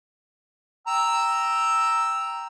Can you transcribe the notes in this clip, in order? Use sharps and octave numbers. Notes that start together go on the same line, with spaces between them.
G5 A#5 E6